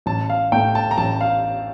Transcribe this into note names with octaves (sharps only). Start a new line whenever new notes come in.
A1 A5
F5
A2 A3 G5
A5
A#5
A1 A5
F5